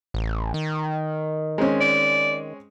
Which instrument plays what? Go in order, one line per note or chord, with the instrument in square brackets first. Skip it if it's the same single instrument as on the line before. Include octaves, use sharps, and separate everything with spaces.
[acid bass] A1
D#3
[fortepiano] G#3 C4 C#4
[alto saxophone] D5